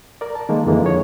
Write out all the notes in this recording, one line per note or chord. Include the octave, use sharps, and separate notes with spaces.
A#4 D5
A5
D#3 G#3 A#3
F2 D3 E3 G#3 A#3
F3 C#5